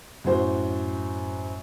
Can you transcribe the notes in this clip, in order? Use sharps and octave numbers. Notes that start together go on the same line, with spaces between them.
F#2 A2 F#4 C5